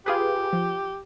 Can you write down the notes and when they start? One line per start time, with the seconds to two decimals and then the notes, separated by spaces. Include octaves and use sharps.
0.06 F4 G4 G#4 B4
0.53 F3